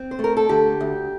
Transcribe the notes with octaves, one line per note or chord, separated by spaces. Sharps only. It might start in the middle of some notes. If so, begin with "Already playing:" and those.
Already playing: C4
C5
A3
A#4
A4
D3 G4
D2